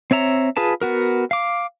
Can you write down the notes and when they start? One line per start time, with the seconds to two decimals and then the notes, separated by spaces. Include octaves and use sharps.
0.11 C4 C#5 E5 A#5
0.57 F4 G#4 B4 A5
0.81 B3 F#4 A#4
1.31 F5 D6